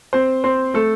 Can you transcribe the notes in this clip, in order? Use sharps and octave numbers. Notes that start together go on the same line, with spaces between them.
C4 C5
C4 C5
A3 A4